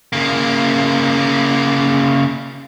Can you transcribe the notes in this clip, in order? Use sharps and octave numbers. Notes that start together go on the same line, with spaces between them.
C#3 A#3